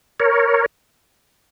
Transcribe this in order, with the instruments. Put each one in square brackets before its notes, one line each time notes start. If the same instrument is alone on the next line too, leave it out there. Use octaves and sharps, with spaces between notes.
[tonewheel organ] A#4 C#5